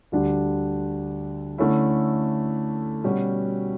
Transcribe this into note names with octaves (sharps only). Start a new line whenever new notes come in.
D2 D3 G3 D4 G4
D3 A3 C#4 E4
B2 G3 C#4 F#4